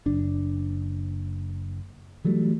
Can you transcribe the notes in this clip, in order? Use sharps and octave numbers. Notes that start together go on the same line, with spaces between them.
F#1 D4
E3 F#3 G3 A3